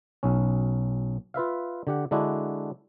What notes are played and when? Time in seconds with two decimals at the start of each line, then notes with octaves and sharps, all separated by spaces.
0.23 B1 C#4
1.34 F4 B4 E5 F5
1.87 D3 G4 F#5
2.11 D3 G#3 D4 E4 F#4